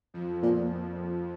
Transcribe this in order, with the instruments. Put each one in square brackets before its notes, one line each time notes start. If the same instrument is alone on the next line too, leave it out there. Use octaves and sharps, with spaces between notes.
[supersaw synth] F2 F3
[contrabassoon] A#2